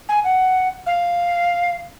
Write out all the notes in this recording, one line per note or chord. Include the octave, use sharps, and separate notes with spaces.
G#5
F#5
F5